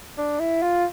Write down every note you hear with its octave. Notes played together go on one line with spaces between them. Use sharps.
D4
E4
F4